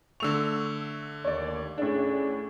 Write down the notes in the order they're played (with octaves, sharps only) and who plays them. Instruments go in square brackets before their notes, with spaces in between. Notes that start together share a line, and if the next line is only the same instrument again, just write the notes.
[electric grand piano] D3 A3 C#6 [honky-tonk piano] E6 F7
[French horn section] D#2 [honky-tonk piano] C#5 D5
[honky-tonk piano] A2 D4 [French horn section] C#4 G#4